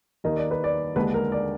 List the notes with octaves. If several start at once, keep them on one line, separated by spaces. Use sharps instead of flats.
D#2 D#3 A#3 D#5
D5
B4
D5
D#2 D3 G#3 D4 B4
A#4
D5